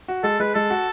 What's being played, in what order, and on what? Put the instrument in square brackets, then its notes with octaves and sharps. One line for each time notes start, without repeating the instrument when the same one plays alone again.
[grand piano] F#4
[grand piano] G#3 [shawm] A4
[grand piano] G#3 [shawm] B4
[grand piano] G#3 [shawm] A4
[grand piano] F#4